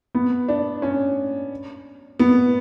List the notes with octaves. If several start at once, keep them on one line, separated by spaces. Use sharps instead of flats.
B3
D4
C#4
B3